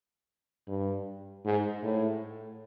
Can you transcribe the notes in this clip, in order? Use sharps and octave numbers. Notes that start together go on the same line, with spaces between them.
G2
G#2
A2